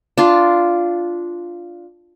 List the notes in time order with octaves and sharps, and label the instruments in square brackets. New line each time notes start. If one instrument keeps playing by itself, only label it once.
[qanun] D4 F4